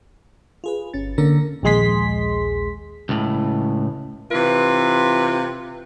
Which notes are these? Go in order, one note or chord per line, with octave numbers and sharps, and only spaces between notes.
F4 G#4 B4
G1 C#4 A6
D3 A#3 C#4 A#4
A#1 D#2 G#3 G#4 C6 B6
C#2 A2
C3 E3 F4 B4